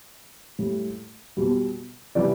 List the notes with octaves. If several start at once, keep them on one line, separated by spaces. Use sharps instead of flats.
A2 G3
B2 G3
C3 E3 G3 D5